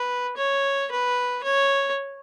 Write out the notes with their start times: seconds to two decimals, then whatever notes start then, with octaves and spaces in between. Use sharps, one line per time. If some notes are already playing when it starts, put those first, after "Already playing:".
Already playing: B4
0.37 C#5
0.91 B4
1.44 C#5